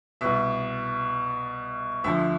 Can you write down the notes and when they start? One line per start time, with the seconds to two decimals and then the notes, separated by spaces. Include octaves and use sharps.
0.21 C2 B2 E5
2.04 D2 D3 F3 E5